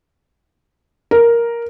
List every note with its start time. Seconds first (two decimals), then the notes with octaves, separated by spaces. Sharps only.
1.11 A#4